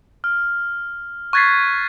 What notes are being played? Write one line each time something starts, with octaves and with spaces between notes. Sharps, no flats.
F6
C#6 F#6 G#6 A6 B6 C7